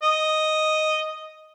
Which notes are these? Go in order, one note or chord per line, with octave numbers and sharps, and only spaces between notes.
D#5